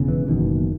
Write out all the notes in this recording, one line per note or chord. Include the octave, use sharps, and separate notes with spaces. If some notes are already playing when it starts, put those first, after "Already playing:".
Already playing: E1 E2 C#3
E3
F#1 E2 B2 D#3